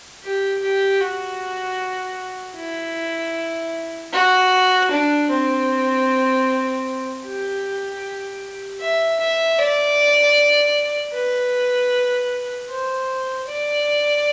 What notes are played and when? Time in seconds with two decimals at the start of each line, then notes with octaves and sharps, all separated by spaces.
0.23 G4
0.62 G4
1.00 F#4
2.57 E4
4.13 F#4
4.91 D4
5.30 C4
7.24 G4
8.81 E5
9.20 E5
9.58 D5
11.14 B4
12.71 C5
13.48 D5